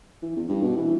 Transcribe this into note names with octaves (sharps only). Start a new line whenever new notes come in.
E3
E2
G2
B2
E3